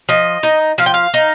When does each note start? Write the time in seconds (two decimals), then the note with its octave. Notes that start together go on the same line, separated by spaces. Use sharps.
0.09 F3 D#5
0.43 D#4
0.78 F3 F5
0.86 G5
0.94 F5
1.14 D#4